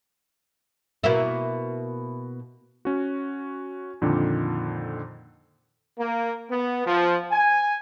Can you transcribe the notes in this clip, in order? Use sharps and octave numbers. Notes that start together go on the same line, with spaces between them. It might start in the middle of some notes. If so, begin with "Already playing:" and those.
B2 A#3 E4
C#4 F#4
F2 A#2 D3 D#3
A#3
B3
F3
G#5